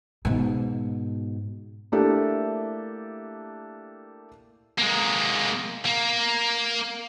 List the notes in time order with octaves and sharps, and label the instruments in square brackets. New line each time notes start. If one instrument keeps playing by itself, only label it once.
[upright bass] G#2 B2
[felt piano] A3 A#3 D4 E4 G4 A4
[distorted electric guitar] G#3 A#3
A#3